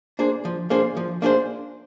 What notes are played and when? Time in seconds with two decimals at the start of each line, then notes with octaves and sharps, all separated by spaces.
0.19 A#3 D4 G#4 C5
0.45 F3
0.70 A#3 D4 G#4 C5
0.97 F3
1.22 A#3 D4 G#4 C5